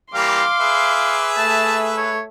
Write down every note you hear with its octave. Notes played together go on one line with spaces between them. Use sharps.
E3 G3 A#3 F5 C6 D6
G#4 B4 E5
A3 A5
C#5